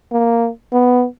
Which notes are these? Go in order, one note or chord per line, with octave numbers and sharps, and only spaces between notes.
A#3
B3